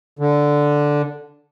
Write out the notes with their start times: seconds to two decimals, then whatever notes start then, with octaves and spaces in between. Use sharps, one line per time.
0.19 D3